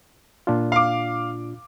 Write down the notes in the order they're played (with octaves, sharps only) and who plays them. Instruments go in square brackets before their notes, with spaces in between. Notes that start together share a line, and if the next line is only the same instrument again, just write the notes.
[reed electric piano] A#2 D4 F4
[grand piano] F5 D6